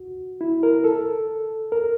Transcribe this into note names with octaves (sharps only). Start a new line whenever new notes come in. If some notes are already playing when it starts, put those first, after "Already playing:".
Already playing: F#4
E4
A#4
A4
A#4